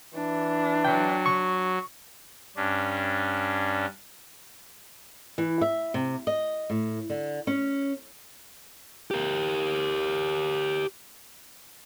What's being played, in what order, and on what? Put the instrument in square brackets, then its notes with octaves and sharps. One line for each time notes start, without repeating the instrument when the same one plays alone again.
[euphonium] E3 [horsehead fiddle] D4
[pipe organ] F#3 [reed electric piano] G5
[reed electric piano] C#6
[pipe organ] G2 C#4 D4
[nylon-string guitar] E3
E5
C3
D#5
A2
D3
C#4
[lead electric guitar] G4 A#4